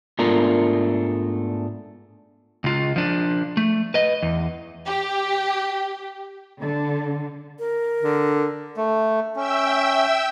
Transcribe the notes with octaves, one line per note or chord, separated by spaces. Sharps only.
G#2 A3 B3 D4 F4 A#4
C#2 F4
F3 D4
A3
B4 D#5
E2
G4
D3
A#4
D3
A3
C#4 E5 G5 E6